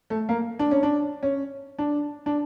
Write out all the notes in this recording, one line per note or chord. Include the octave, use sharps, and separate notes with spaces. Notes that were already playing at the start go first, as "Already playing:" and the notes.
A3
A#3
D4
C#4
D4
C#4
D4
D4